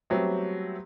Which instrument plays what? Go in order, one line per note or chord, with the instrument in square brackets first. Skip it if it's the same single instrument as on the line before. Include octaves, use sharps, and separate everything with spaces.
[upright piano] F#3 G3 A3 B3 C4